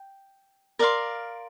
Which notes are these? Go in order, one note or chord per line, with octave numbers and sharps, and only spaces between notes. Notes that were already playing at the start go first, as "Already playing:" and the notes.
Already playing: G5
A#4 D5 F5 C6